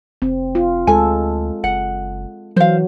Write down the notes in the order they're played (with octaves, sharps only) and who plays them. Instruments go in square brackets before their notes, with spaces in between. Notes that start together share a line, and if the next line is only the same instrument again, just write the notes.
[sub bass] F1 [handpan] C4
[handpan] F4
[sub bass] D2 [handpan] G#3 A4 [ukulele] G#5
[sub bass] F#1 [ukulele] F#5
[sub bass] E3 [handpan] F#3 [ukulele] C5 F5